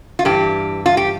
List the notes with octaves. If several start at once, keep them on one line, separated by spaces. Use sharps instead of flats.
F4
G2 E3 G4
F4
G4